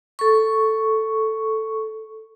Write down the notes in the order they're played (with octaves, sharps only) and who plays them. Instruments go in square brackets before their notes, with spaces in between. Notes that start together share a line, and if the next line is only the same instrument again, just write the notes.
[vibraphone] A4 C#6